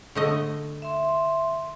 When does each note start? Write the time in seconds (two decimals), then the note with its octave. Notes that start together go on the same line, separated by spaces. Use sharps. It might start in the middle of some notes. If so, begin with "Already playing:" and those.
0.15 D3 A3 D#5
0.82 E5 C6